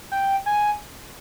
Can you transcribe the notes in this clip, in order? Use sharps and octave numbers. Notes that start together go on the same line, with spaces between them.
G5
G#5